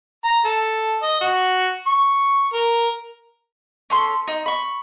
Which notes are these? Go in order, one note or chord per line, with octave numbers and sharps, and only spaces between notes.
A#5
A4
D#5
F#4
C#6
A#4
C#4 A4 C6
D#4
B5 C#6